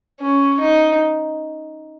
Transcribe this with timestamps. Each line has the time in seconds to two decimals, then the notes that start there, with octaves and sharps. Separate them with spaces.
0.21 C#4
0.59 D#4